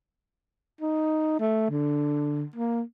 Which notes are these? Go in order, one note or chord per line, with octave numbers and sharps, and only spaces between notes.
D#4
A3
D3
A#3